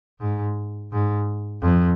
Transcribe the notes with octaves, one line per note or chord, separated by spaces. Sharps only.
G#2
G#2
F2